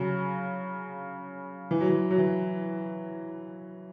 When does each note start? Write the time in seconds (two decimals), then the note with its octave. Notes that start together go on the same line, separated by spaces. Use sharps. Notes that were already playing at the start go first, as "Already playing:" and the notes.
Already playing: C#3 F#3
1.71 E3
1.80 F#3
1.89 E3
2.11 F#3
2.18 E3